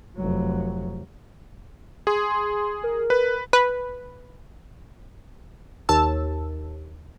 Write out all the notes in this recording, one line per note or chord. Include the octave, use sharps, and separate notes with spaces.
F1 F#3
G#4 C6
C6
A#4
B4
B4
D#2 A5 E6